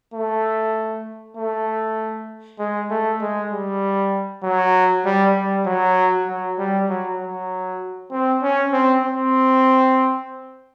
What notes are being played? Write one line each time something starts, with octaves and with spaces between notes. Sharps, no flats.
A3
A3
G#3
A3
G#3
G3
F#3
G3
G3
F#3
F#3
G3
F#3
F#3
C4
C#4
C4
C4